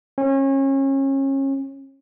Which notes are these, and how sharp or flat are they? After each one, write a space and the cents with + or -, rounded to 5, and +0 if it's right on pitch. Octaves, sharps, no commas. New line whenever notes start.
C#4 -30